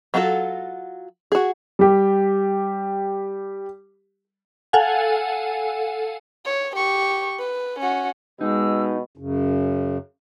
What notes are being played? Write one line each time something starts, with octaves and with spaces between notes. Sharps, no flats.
F#3 F4 F#4 G#4 A4
F#4 G#4
G3 G4
A4 F5 F#5 G#5
C#5
G4 C#6
B4
C#4 F#4
B2 G#3 D#4 E6
F#2 C#3